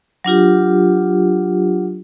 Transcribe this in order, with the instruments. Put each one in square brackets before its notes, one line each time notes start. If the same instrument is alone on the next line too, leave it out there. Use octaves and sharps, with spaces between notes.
[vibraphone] F#3 D4 F4 G4